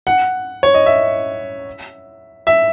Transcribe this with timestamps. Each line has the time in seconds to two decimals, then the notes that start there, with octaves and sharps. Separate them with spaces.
0.07 F#5
0.63 C#5
0.74 D#5
0.86 E5
2.47 E5